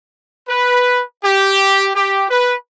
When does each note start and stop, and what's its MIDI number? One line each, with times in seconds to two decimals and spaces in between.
0.49 1.03 71
1.25 1.91 67
1.96 2.26 67
2.30 2.56 71